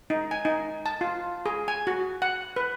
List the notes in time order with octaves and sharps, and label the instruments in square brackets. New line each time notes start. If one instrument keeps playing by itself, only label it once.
[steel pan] D#4
G#5
D#4
A5
F4
G#4
G#5
F#4
F#5
B4